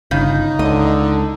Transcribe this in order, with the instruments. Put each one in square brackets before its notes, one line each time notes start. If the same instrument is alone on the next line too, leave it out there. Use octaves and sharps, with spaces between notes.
[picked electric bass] G1 [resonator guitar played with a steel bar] C#3 [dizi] D#4
[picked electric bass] C#2 [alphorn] D3 [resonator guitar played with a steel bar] D#5